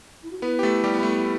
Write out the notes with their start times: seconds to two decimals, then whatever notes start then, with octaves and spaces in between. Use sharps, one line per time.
0.23 E4
0.31 F#4
0.40 B3 E4 B4
0.59 G4
0.63 A3 A4
0.84 G3 G4
0.94 B3
1.03 A3